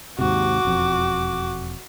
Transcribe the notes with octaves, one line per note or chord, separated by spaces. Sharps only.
D#2 G#2 C3 F#4 D6
E1 F2